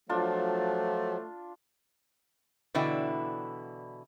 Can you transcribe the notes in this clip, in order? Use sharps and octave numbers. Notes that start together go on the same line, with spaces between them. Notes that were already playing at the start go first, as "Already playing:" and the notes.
F3 F#3 A3 D4 F4
B2 D3 E3 E4 D5 G5